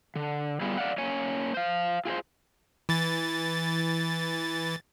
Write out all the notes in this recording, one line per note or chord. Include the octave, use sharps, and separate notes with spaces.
D3
G3 B3 F4 G#4
D5 F5 F#5
A#3 C#4 C#5 G#5
C5 F5
F4 G#4 A4 C5
E3 A6